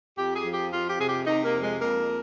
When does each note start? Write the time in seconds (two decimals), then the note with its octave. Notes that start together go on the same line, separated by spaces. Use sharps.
0.18 F2 G4
0.36 G#4
0.45 F3
0.54 G4
0.72 F2 F4
0.90 G4
1.00 C3 G#4
1.09 G4
1.26 C3 D#4
1.45 A#3
1.54 F2
1.63 G#3
1.81 F2 A#3